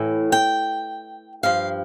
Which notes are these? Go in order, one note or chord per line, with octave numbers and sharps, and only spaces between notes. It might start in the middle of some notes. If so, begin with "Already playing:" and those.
Already playing: A2 E3
G5
G2 F3 F5